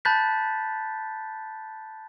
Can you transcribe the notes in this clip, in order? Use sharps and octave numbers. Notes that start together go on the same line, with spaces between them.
A5 B5 F#6 G6 A6 B6